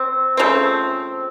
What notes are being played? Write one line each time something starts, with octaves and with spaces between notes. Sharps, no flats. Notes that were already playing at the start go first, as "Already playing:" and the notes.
Already playing: C4
C#3 F3 A3 C4